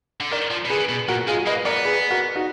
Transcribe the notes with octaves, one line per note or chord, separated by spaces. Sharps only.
D3
D#3 A#4 D5
F3
B2
D3 G#4 B4
B2
A#2 F#4 A#4
G#3 F4 G#4
A#3 B4 D#5
B3 A#4 D5
G#4 B4
F#4 A#4
D#4 F#4